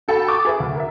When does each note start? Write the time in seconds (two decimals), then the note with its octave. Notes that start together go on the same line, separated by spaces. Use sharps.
0.08 F#4 A4 G5 A5 B5
0.28 D6 D#6 A6
0.45 G#4 B4 E5
0.60 D2
0.75 A#4 E5